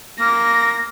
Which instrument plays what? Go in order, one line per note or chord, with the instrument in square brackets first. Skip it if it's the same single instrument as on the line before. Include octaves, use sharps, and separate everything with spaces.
[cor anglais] A#3 [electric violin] A#6